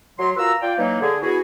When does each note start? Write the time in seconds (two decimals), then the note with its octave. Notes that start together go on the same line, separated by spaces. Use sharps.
0.19 F#3 C6
0.36 F4 F#4 A#4 B4 A#5 E6
0.61 F4 D5 G5
0.78 E3 F#3 A#3 D#4
1.01 D3 G#4
1.22 B3 E4 F#4 G#4